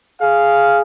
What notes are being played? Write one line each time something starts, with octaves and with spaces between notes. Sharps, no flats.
G#4 F5